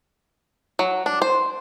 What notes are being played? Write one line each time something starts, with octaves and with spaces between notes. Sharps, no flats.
F#3
D4
C5